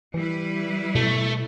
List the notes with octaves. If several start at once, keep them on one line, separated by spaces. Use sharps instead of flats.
E3 G3 E4 B4
B2 A3